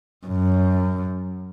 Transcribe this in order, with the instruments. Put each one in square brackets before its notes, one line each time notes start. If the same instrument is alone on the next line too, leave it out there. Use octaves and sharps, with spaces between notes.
[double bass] F#2